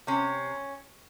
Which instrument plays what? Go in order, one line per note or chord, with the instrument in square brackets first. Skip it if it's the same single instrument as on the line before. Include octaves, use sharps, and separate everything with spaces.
[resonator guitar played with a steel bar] C3 C#4